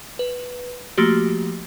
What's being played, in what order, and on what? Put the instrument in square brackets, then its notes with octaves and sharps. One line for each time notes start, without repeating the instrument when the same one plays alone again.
[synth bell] B4
F3 A3 A#3 F#4 G4